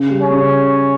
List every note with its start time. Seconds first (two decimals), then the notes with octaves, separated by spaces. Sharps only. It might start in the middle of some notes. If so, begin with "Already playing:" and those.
Already playing: C#3
0.10 G3
0.20 C#4
0.30 C#3